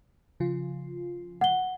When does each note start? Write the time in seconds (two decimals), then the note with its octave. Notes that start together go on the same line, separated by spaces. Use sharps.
0.40 C#3 F3 F4
1.41 F#5 G7